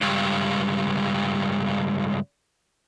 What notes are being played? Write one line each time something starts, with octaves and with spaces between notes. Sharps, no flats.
C#2 G2